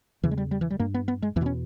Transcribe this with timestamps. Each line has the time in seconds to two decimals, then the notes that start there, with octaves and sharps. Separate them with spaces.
0.23 E2 C#3 E3
0.31 G#3
0.37 G3
0.51 G3
0.61 E3
0.70 G3
0.79 G2 A#3
0.94 B3
1.08 B3
1.22 G#3
1.36 E2 E3
1.41 B2 B3
1.46 C#4